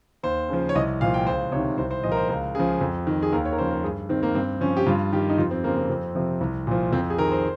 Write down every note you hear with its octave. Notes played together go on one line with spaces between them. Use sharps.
D#2 C5
C#3 F3
C#5
C2 D#5
A#2 F3 F5
G5
C#2 C5
C3 D#3 C#5
C2 C5
C5
A#2 F3 D#5
A#4
C5
C#2 A#4
C#3 F3 G#4
F2
D#3
G#4
D#2 A#4
C#5
A#4
C#3 F3 C5
A#4
G2 G#4
D#3 C4
A#3
G2 C4
F3 C#4
G4
G2 F4
D#3 G4
D#4
F2 F4
C4
C#3 F3 A#3
C4
F2
C3 F3
C2
A#2 F3
F2 C4
G#4
D#3 A#4
C5